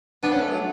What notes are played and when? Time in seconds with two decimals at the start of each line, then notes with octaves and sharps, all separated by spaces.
0.23 B3 D4
0.33 C#4
0.40 A3
0.50 F#3